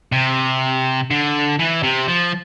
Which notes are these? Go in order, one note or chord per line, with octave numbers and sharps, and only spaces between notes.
C3
D3
E3
C3
F3